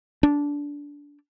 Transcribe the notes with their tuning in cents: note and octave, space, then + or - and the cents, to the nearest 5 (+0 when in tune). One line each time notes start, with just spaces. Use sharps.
D4 -20